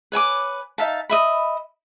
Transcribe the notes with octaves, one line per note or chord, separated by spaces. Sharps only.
B4 C#5 G#5 D6
D#4 E5 F5 A5
D#5 E5 B5